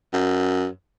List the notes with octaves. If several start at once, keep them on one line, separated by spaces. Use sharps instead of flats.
F#2